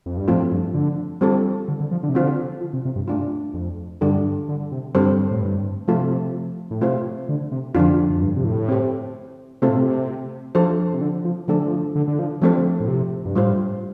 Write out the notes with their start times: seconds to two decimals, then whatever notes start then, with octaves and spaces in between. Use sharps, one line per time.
0.06 F2
0.17 G2
0.27 A2 F3 A3 C4 F4 A4
0.52 G2
0.74 D3
1.21 F3 G3 C4 A4
1.68 D3
1.80 D3
1.91 F3
2.03 D3
2.09 C3
2.15 D3 C4 F4 C5
2.61 F3
2.73 C3
2.85 C3
2.96 G2
3.08 A3 D4 F4
3.54 F2
4.01 G2 D3 G3 D4 A4
4.49 D3
4.72 C3
4.95 G2 D3 G3 C4 A4 C5
5.31 A2
5.41 G2
5.88 C3 F3 A3 F4 A4
6.71 A2
6.81 C3 A3 F4 C5
7.29 D3
7.52 C3
7.75 F2 D3 F3 D4 F4
8.10 F2
8.22 G2
8.36 C3
8.44 A2
8.68 C4 G4 C5
9.62 C3 A3 C4 F4 A4 C5
9.69 A2
9.77 C3
10.55 F3 D4 F4 A4 C5
10.93 C3
11.01 D3
11.25 F3
11.48 D3 F3 A3 D4 A4
11.66 F3
11.95 D3
12.08 D3
12.19 F3
12.41 D3 F3 A3 C4 A4 C5
12.80 A2
12.88 C3
13.25 G2
13.35 A2 G3 F4 C5